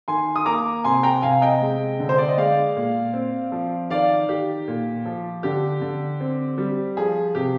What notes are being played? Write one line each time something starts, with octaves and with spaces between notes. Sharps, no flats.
D#3 G#5 C6
D#6
A#3 A#5 D6
C3 G#5 C6
G5 A#5
C3 F5 G#5
D#5 G5
G#3
D3
C5
D5
D#5
G#3 D5 F5
A#2
C4
F3
D#3 D5 F5
D#3 G4
A#2
F3
D3 G4
D3
C4
G3
F3 G#4
C3 G4